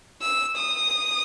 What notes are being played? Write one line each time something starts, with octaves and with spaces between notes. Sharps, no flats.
E6
D#6